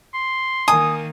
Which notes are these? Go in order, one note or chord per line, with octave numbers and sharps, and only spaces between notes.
C6
D#3 A#3 G#5 D#6